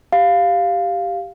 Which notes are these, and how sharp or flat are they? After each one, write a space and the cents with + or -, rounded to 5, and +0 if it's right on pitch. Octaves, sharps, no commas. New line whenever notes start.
G4 +0 F5 +0